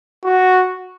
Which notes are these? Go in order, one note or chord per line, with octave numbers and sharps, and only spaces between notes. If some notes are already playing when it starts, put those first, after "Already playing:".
F#4